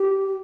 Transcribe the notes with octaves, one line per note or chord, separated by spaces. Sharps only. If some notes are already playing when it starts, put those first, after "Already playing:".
Already playing: G4
G4